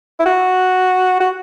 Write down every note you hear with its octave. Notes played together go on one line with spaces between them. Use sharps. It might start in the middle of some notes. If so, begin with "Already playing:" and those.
E4
F#4
F#4